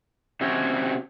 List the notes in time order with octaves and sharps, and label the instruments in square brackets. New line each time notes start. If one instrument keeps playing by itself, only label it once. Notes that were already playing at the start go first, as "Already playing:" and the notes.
[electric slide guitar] C3 C4 C#4 F#4